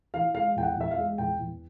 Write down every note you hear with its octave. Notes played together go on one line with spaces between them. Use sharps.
E3 F5
G#3 F5
E2 G5
F#5
E2 E5
F5
G#3
E2 G5
E2